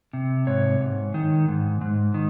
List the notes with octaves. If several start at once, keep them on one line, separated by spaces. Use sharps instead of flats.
C3
G#2 C#5
G#2
D#3
G#2
G#2
D#3